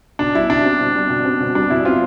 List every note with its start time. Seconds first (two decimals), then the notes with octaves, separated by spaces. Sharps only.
0.19 B2 D4
0.35 G3 E4
0.50 B2 D4
0.65 C4
0.80 B2
0.95 G3
1.10 B2
1.25 C4
1.40 B2
1.55 G3 D4
1.70 B2 E4
1.85 C4 F4